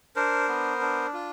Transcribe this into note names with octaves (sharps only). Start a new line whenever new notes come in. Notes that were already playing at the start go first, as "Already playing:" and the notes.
D4 A#4 C5
B3
D4
F4